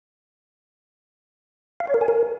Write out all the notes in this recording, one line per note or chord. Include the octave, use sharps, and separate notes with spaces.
F5
C#5
A#4
G#5
A#4